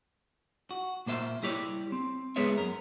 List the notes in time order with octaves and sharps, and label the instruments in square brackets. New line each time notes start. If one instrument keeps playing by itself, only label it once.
[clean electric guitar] F#4
A#2 A#3 C5 E5
G3 E4 G4 C#5 D5
C4
G#3 B3 G#4 B4 C#5 E5
F#2 A#4